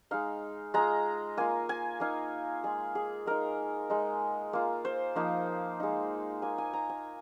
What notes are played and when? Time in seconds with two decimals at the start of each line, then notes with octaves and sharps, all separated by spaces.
0.11 G#3 D#4 F5
0.74 G#3 F4 A#5
1.37 A#3 F4 G#5
1.69 G#5
2.00 A#3 D#4 F5
2.64 G#3 F4 G#4
2.95 G#4
3.26 G#3 D#4 A#4
3.90 G#3 D#4
4.53 A#3 F4
4.85 C5
5.16 F3 A#3 D#4
5.80 G#3 D#4
6.42 A#3 D#4 G#5
6.58 G#5
6.73 A#5
6.89 G#5